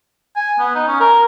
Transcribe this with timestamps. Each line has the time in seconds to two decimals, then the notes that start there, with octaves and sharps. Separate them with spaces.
0.36 G#5
0.59 B3
0.75 D#4
0.87 C#4
1.00 A#4